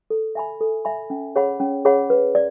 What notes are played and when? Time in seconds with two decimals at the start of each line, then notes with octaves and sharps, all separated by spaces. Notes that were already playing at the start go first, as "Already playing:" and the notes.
0.10 A4
0.35 E5 G#5 B5
0.61 A4
0.85 E5 G#5 B5
1.10 C#4
1.36 G#4 C#5 F#5 B5
1.60 C#4
1.85 G#4 C#5 F#5 B5
2.10 B4
2.35 D5